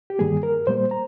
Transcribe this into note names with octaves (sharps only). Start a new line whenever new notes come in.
G4
G2 D#3 G3 A#3 G#4
A#4
A#2 G3 A#3 C5
A#5